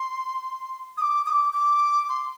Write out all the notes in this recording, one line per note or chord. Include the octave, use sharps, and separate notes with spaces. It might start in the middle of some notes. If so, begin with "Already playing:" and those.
Already playing: C6
D#6
D6
D#6
D6
D6
C6